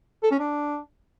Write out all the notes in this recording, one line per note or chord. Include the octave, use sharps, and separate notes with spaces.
A4
C#4
D4